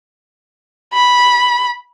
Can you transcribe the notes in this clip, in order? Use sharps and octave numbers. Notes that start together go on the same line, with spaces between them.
B5